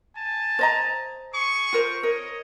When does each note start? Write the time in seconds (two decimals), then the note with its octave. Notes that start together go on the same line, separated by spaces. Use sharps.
0.16 G#5 A5
0.59 C5 D#5 A#5
1.33 G#4 C#6
1.73 F4 A#4 C5
2.03 A#4 C#5 D#5